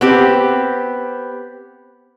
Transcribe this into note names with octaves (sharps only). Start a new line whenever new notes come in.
B3 C4 G4